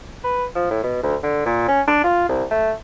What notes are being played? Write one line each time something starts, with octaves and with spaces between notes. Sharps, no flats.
B4
F3
A2
B2
D2
D3
A#2
C#4
D4
F4
C2
A3